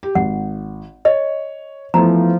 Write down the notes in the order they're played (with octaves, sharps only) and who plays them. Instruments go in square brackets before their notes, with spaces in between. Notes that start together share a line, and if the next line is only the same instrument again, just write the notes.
[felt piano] G4
[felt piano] G#1 [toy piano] F#5
[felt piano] C#5 [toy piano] D#5
[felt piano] E3 A3 B3 [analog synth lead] F3 [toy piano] A#5